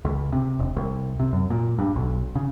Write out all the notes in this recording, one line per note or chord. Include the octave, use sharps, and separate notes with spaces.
C#2
C3
E1
C2
C3
F#2
A#2
G2
B1
C#3